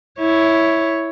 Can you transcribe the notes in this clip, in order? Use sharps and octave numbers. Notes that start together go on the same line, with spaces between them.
E4 C#5